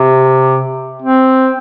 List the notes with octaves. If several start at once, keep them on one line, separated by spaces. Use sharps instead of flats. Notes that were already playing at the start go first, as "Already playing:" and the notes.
Already playing: C3
C4